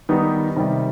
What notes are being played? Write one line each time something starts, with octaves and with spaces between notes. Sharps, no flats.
D#3 G3 B3 D#4
C3 D#3 G3